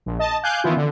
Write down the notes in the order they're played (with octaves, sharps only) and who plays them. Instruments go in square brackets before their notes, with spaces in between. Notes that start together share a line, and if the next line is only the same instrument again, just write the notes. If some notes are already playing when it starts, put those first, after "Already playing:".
[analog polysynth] A#1
D#5 A5
F5 G#5 D6 F#6 G6
D#3 E3 B3 C#4 E4 F4
D3